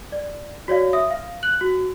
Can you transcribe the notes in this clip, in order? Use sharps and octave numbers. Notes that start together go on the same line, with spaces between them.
D5
F#4 C#5 D5 F5
E5 D#6
F5
F#6 F#7
F#4